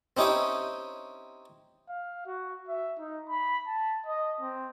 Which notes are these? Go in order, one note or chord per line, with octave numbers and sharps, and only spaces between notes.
C4 C#4 D#4 E4 G4 C#5
F5
F#4
E5
D#4
B5
A5
D#5
C4